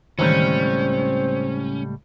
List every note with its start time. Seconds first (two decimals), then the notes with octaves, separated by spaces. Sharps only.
0.19 C#2 A2 D#3 E3 G3 C4 C#4